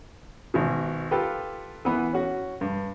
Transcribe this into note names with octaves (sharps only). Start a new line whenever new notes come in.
G#1 B2
F4 G4 A4 B4
E3 B3
C#4 F#4
G2